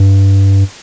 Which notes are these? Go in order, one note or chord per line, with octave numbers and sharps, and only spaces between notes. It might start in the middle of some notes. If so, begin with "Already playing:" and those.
Already playing: G2